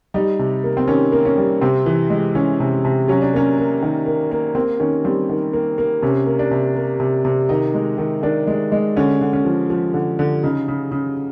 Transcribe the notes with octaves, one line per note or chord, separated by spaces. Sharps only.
G3 D#4
C3
A#3
C4
D#3 C#4
A#3
C#4
G3
C3 C4
E3
G#3
E3 C#4
C3
C3
F#3 C#4
D4
A#3 C#4
A#3
D#3
A#3
A#3
A#3 C4
D#3 C#4
G3 C4
D#3
A#3
A#3
C3 C#4
A#3
D4
C3
A#3
C3
C3
D#3 D#4
G#3
D#3
D#3 D4
G#3
G#3
D3 C#4
D3
C#4
F3
F3
D3
D3
C#3 D#4
C#3
C#3